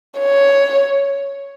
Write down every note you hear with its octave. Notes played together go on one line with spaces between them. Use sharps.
C#5